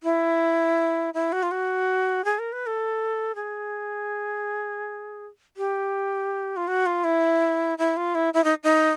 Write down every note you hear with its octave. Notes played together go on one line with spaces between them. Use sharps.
E4
E4
F#4
F4
F#4
G#4
A#4
B4
A4
G#4
G4
F4
F#4
F4
E4
E4
F4
E4
E4
D#4
D#4